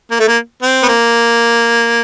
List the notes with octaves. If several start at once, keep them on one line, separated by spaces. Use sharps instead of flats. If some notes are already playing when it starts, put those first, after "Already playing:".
A#3
A3
A#3
C4
B3
A#3